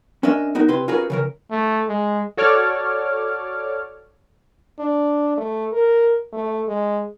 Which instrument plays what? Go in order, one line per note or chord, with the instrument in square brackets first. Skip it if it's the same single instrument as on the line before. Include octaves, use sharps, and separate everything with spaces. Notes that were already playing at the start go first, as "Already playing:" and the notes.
[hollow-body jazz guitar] C#4 D4 A#4 D#5 E5
B3 D#4 F#4 A#4
C3 E4 B4 C6
C#4 F4 F#4 G#4 A#4 B4
C#3 E3 A#4
[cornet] A3
G#3
[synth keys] F#4 A4 C#5 D5 D6 F6
[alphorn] D4
A3
A#4
A3
G#3